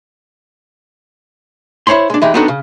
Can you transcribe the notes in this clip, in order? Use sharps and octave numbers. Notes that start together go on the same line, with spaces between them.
E4 C5 C#5 B5 C6
G#3 D4
E3 G#3 D#4 G4
B3 C4 D4 D#4 F#4 A4
C#3